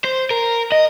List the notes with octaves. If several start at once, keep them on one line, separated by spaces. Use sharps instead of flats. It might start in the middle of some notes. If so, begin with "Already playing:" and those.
C5
A#4
D#5